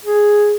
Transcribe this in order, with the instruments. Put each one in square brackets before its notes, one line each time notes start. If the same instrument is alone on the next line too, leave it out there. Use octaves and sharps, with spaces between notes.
[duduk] G#4